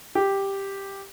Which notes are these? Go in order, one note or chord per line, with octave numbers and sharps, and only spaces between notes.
G4